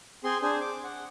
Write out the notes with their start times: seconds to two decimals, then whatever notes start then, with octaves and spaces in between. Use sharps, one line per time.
0.24 C4 G#4 C6
0.42 D4 G#4 C5
0.61 D6
0.84 F#5